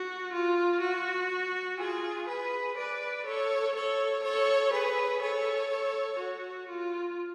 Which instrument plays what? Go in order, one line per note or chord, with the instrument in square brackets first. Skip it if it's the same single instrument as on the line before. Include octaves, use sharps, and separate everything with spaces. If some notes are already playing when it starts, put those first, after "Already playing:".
Already playing: [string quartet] F#4
F4
F#4
F4 G#4
G#4 B4
B4 D5
A4 C#5
A4 C#5
A4 C#5
G#4 B4
A4 C#5
F#4
F4